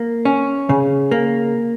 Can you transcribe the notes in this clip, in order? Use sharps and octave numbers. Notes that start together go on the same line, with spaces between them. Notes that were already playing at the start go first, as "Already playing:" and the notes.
Already playing: A#3
C#4
C#3
A#3